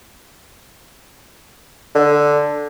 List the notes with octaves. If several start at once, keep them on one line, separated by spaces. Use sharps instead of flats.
D3